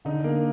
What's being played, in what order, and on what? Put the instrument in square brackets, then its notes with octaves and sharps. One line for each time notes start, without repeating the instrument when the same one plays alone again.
[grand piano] D3 [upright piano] D#4
[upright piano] A#3